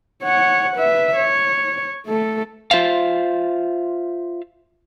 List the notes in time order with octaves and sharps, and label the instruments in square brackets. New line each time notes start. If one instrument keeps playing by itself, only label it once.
[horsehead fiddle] C#5 F#5
B4 E5
C#5
A3 A4
[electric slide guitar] F4 C5 E5 F5